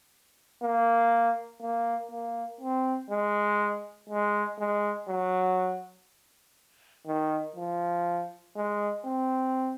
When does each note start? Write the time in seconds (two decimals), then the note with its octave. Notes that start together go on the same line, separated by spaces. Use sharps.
0.63 A#3
1.62 A#3
2.11 A#3
2.61 C4
3.10 G#3
4.10 G#3
4.59 G#3
5.09 F#3
7.07 D#3
7.56 F3
8.56 G#3
9.05 C4